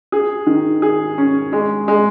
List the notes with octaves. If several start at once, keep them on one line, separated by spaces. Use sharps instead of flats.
G#4
D#3
G#4
C#4
G#3
G#3